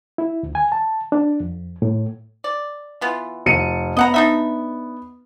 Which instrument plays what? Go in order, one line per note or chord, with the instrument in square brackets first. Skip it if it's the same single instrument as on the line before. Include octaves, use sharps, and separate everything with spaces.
[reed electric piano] E4
D2
G#5
A5
D4
F2
A2
[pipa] D5
E3 B3 F4
[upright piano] F1 C#7 D#7
[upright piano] B3 [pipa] D#5 F#5 A#5
[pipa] D4 D#4 E5